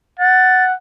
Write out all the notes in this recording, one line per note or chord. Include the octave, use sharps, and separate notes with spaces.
F#5 A6